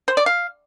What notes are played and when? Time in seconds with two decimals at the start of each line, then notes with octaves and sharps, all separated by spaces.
0.08 C5
0.17 D5
0.26 F5